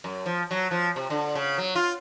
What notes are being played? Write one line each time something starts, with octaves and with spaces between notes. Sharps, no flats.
F#2
F3
F#3
F3
C3
D3
C#3
F#3
F4